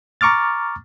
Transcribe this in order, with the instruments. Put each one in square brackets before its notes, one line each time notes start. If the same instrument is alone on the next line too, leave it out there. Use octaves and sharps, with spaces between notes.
[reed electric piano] A#5 C#6 D6 F6 A6